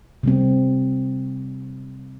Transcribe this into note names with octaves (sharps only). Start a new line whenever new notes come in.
C3 G3 C4